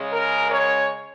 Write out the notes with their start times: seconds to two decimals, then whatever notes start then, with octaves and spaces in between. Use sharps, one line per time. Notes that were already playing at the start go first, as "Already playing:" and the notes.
Already playing: C#3 G#3 C#4
0.12 A#4
0.49 C#5